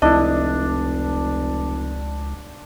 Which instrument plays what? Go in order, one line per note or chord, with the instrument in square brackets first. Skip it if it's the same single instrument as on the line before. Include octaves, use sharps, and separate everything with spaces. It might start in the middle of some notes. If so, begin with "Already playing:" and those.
[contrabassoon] F1 [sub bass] C#2 [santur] D4 [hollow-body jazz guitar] E4 D#5